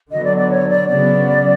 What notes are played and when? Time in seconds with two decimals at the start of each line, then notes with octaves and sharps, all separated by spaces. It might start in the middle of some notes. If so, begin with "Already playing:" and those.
0.11 D3 F#3 B3 D#5
0.24 D5
0.37 D5
0.50 C#5
0.69 D5
0.88 C#3 F#3 B3 D5